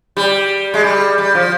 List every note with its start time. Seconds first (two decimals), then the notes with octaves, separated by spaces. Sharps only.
0.17 G3
0.74 G#3
0.84 G3
1.18 G3
1.35 F3